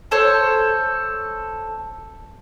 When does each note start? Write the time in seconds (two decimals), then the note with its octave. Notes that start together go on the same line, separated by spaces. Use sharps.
0.11 A4 C5 C#5